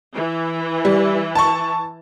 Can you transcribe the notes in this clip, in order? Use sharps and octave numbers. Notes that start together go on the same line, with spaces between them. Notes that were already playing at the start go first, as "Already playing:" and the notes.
E3
G3
A5 C#6